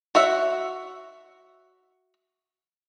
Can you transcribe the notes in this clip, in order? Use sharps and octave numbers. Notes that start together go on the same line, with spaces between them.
F#4 C#5 E5 F#5